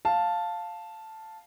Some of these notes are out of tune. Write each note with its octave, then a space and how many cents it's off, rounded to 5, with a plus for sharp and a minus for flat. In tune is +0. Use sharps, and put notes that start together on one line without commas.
F5 +0 A5 +0